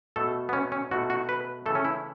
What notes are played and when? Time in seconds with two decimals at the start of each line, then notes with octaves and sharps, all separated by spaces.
0.16 B2 A3 A4
0.49 B3
0.53 C#4
0.72 C#4
0.91 B2 A3 F#4
1.10 F#4
1.29 B4
1.66 C#3 E3 A3 A4
1.75 C#4
1.85 E4